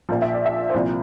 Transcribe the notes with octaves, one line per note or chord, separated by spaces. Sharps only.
A#1 A#2 F3 F5
E5
D5
E5
C5
C2 A#2 F3 D5